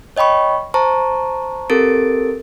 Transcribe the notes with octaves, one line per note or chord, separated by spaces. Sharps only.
C#5 D#5 G5 B5 C#6
C5 A5 A#5 C#6
C4 G4 A4 A#4 A6 D7